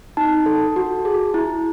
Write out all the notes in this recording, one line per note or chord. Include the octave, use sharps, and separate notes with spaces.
D#4 A5
A4
F#4
G#4
E4